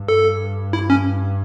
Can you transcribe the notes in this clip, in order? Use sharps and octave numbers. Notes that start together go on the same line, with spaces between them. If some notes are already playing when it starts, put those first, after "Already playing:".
Already playing: G2
A4
E4
C#4